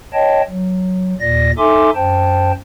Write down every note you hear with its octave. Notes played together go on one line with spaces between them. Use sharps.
C#5 D#5 G5 A5
F#3
D#2 A#2 D5 A#6
D#4 A4 E5 G#5 C6 D6
F#2 C5 G5 A5